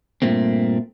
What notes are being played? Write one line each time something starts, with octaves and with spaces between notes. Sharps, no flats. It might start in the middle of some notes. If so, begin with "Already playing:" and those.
G2 A#2 A3 A#3 C4